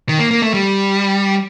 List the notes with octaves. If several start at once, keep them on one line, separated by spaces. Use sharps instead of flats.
D#3
A#3
A#3
A3
G3